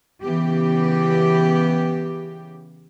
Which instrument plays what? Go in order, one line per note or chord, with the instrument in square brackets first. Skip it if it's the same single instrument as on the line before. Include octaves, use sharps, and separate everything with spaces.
[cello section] C#3 E3 B3 G4